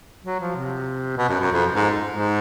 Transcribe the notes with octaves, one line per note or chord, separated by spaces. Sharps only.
F#3
F3
C3
B2
F#2
F#2
F2
G#2
G#2